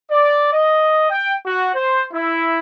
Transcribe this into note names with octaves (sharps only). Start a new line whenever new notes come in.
D5
D#5
G5
F#4
C5
E4